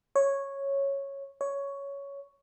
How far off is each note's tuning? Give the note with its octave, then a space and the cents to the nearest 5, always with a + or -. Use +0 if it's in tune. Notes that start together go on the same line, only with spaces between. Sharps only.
C#5 -5
C#5 +10